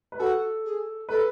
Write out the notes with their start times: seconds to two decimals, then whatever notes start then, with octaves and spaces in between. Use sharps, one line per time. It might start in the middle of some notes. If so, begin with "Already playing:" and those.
0.12 B4
0.19 F#4 A4
0.64 G#4
1.09 A4 B4